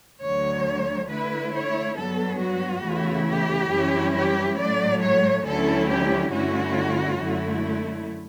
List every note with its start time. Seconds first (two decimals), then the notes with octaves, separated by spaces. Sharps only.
0.22 D2 D3 F#3 C#5
1.09 D3 A3 E4 B4
1.53 C#5
1.96 G2 F#3 B3 A4
2.40 F#4
2.84 E2 C#3 E3 A3 E4
3.27 G4
3.71 F#2 E3 G3 C#4 E4
4.15 G4
4.58 A2 F#3 A3 D5
5.01 C#5
5.46 D2 D3 F#3 C#4 E4 A4
5.89 G4
6.32 G2 D3 A3 C#4 E4 F#4
7.20 F#2 D3 A3 E4